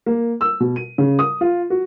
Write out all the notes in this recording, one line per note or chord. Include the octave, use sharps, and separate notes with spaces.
A#3
E6
B2
D#7
C#3
D#6
F4
F#4